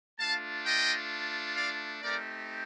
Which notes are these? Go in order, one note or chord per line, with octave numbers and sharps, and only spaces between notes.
A3 D4 F4 F5 A5
D#5 G5
D5 F5
A3 C4 D#4 G4 A#4 D5